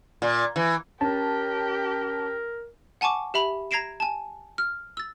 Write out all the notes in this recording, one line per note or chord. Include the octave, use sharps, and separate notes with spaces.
A#2
E3
C#4 G4 A#4 A5
F#5 G#5 A5 C#6 D6
G4 E5 B5 F7
A#5 G#6 A#6 C7 D7 E7
G#5 A5
F6
E6 A6